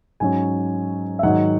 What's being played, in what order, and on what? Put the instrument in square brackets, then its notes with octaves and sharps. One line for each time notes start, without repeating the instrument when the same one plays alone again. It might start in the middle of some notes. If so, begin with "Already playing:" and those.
[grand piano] G#2 F#3 C#4 G#5
E5
G#2 D#3 F#3 F#5